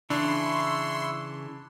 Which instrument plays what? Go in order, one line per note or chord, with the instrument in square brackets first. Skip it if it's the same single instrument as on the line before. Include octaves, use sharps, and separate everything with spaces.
[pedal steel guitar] C#3 E3 [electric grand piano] D4 [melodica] E4 C#6 E6 [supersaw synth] C6